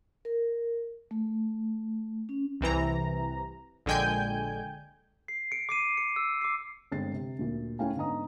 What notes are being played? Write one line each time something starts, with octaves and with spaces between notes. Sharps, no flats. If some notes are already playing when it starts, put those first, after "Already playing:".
A#4
A3
C#4
C2 C3 E3 A#5
A#1 D3 G#3 G5 G#5 G6
C7
C#7 D7
D6 C7 D#7
C#7
E6
D6 C7
G1 G#3 C4 G#4 A6 C7
C3
D2 A#2
A3 C#4 E4 F5 G5 G#5
G#2 D3 B3 D#5 A#5 D#6